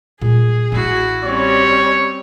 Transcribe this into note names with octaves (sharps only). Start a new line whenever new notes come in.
A#2 G3 G#4
A1 D4 E4 F#4
G3 C4 C#4 C#5